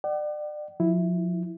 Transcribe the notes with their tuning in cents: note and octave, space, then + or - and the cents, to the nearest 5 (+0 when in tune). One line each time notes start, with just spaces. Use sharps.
D5 +35 F#5 +45
F3 +30 E4 +0